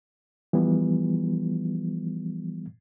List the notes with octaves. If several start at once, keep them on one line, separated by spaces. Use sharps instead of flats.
E3 F3 G3 B3